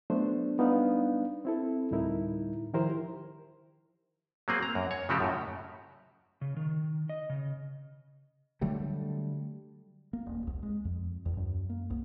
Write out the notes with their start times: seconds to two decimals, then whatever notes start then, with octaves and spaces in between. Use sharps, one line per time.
0.10 F#3 A3 B3 D4 C5
0.59 G3 B3 D4 D#4 B4 F5
1.45 C4 E4 A4
1.91 D2 A2 G3 D#4 E4 A#4
2.73 D#3 F3 E4 G4 A#4 C5
4.48 F#3 A#3 C4 G#4
4.63 A#5
4.75 F#2
4.91 C#5
5.09 C#3 F3 A3 F#4 G4
5.20 F#2 A2
6.41 C#3
6.56 D#3
7.09 D#5
7.29 C#3
8.61 D3 F#3 G3 A3
10.13 A#3
10.26 D#1
10.47 C2
10.63 G#3
10.85 F2
11.26 E2
11.37 F#2
11.70 A#3
11.90 C2